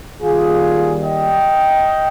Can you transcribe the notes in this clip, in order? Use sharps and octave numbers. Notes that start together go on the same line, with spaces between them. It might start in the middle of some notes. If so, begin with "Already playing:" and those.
D#3 G3 A#3 F4 G#4
D#5 G5